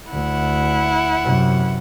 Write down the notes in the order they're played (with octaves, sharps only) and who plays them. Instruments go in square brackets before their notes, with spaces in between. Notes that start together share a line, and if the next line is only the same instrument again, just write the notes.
[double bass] D2 [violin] E4 F#5
[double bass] F#2 C3